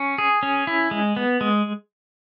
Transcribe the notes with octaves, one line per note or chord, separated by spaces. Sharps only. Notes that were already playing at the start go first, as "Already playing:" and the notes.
Already playing: C#4
G#4
C#4
E4
G#3
B3
G#3